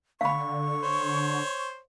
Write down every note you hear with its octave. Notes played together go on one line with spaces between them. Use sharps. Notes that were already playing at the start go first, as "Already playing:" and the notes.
D3 F5 B5 C#6
C5 C#5